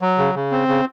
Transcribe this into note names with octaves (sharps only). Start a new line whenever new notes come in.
F#3
C#3
C#3
C4
C#3